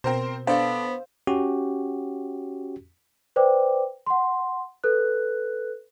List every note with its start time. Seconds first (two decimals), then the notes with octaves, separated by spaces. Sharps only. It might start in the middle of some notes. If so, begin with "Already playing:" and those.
0.04 B2 C4 A#4 C5
0.47 B3 D4 A4 C5 F5
1.27 C#4 F#4 G4
3.36 B4 C5 D5 G5 D6
4.06 F#5 C6
4.84 A4 B4 F#6